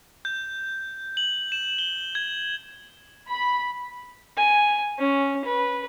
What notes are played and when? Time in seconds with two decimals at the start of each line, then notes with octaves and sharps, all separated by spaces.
0.25 G6
1.17 F#7
1.52 E7
1.78 G7
2.15 G#6
3.29 B5
4.37 G#5
4.99 C#4
5.45 B4